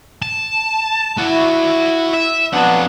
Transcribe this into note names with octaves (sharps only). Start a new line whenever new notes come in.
A5
E4 F#4 D5
E5
F2 F#3 B3 D4 F#5